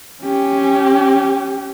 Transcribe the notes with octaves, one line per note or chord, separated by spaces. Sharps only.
C#4 G4